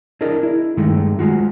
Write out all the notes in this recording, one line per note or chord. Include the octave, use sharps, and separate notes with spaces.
D4 E4 G#4 A#4 D#5
E4
G2 D#3 G#3 A3
G#3 F4 F#4